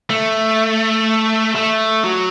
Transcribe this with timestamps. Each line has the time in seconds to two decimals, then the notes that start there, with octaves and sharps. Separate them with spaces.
0.10 A3
1.56 A3
2.04 F#3